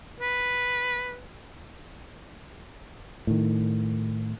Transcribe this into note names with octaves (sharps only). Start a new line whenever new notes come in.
B4
A2 D#3